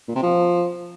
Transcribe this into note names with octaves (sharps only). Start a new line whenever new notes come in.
A#2
C3
F3